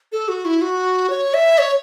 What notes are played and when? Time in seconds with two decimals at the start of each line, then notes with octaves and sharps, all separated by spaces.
0.12 A4
0.28 F#4
0.45 E4
0.61 F#4
1.10 C#5
1.34 E5
1.58 C#5